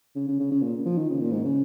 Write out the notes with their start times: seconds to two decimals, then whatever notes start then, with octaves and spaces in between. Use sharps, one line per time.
0.15 C#3
0.28 C#3
0.40 C#3
0.51 C#3
0.63 A#2
0.85 F3
0.98 D#3
1.10 C#3
1.21 A#2
1.32 G#2
1.45 C#3